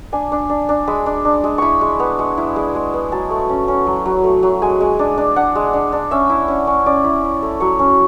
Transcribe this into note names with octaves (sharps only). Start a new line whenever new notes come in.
D4 G#5
D4
D4
D4
G#3 B5
D4
D4
G#3
E4 B5 C#6
G#3
B3
G#3
E4
G#3
G#3
B3
F#3 A5
A3
C#4
C#4
F#3
F#3
A3
F#3
G#3 G#5
G#3
D4
D4
D4 F#5
G#3
D4
D4
C#4 E5
E4
C#4
C#4
C#4 D5
E4
E4
A3
F#3 C#5
C#4